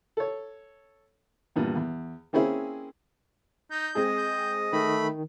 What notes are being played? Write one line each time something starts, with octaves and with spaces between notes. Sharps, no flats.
A4 C#5
E2 G2 A#2
E2
A#3 C4 C#4 E4 G#4 C5
D#4 G6
G#3 C4 G#4 D#5
G6
D#3 A3 B5